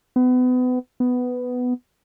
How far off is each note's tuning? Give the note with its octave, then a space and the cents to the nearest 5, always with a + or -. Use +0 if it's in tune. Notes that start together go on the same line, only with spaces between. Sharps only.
B3 +30
B3 +10